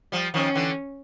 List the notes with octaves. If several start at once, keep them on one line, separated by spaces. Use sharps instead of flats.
F3 G3
D#3 F3 C#4
D3 E3